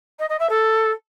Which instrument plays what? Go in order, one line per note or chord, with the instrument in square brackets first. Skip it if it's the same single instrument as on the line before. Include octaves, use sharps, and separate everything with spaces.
[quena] D#5
D#5
E5
A4